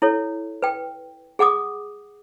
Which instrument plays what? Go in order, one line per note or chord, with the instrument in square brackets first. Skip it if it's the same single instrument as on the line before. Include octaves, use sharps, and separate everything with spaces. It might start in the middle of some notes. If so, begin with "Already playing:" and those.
[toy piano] E4 A4 C#5
B4 G5
G#4 F#5 D6 D#6